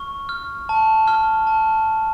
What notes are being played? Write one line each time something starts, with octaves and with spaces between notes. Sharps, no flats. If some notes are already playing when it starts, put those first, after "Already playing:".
Already playing: C#6 F6
F6
A5
F6
A5